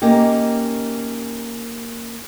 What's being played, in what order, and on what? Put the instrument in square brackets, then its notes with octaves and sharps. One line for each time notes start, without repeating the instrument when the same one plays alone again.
[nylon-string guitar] A#3 C#4 D#4 G4